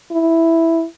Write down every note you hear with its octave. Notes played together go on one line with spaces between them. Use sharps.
E4